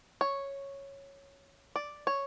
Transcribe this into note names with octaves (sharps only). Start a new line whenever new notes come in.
C#5
D5
C#5